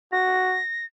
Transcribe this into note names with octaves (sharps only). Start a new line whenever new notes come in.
F#4 A#6